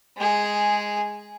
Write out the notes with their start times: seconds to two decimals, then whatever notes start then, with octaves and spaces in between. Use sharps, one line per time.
0.17 G#3 G#4